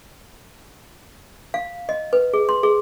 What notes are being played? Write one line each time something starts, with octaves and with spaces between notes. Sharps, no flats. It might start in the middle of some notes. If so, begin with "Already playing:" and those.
F5
D#5
B4
G#4
C6
G#4